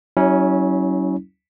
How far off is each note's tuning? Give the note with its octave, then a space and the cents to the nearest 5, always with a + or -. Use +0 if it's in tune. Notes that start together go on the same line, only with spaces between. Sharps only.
F#3 +30 C#4 +0 E4 -35